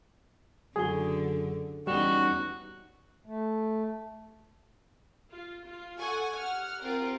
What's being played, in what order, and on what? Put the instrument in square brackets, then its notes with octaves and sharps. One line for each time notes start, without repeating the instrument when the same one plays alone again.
[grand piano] F#1 F#4 G7 [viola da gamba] D3 [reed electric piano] G#4
[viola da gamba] E2 C#4 D#4 [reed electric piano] G3 [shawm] F#4 [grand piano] E7 G7
[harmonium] A3
[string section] F4
F4
A4 F#5 G#5 C#6
G4 F#5 F6
C4 F4 G4 A#4